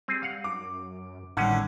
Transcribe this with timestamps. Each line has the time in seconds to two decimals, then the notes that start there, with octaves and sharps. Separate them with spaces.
0.08 G3 C4 G#4
0.23 F5 F#5
0.44 F#2 D6
1.37 G#1 A2 D3 D#3 G3 C#4 F#5